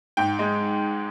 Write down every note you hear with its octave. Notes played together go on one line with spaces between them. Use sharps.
G#2 G5
G#3